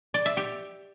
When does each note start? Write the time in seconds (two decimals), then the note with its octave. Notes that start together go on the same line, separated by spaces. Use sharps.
0.14 D5
0.26 E5
0.37 G4